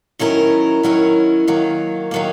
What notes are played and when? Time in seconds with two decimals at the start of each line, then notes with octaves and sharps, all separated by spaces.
0.19 D#3 F#3 C#4 E4 A#4
0.83 D#3 F#3 C#4 E4 A#4
1.48 D#3 F#3 A#3
2.11 D#3 F#3 A#3